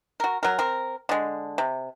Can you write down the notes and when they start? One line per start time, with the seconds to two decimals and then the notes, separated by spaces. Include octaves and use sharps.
0.20 F#4 A#4
0.43 F#3 A#4
0.59 C4 A#4
1.09 D3 G#3
1.58 C3